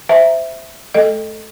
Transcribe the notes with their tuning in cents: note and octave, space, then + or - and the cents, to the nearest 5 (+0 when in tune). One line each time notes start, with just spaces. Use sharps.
C5 -15 E5 +0 A#5 +0
A3 -35 A4 +0 D#5 +0